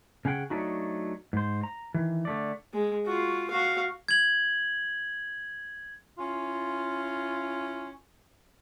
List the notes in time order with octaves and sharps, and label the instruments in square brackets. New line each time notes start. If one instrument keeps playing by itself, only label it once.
[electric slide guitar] C#3 C#4 G#4 F#5 G5
F#3 A3 D4 D#4 F#4
G#2 C5
A#5
D#3 E3
D3 A3 D5
[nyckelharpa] G#3
F4 F#4
F#4 F5
[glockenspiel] G#6 F#7
[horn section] C#4 E4 F4